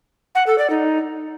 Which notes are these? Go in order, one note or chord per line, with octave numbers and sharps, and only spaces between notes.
F#5
A4
D5
D#4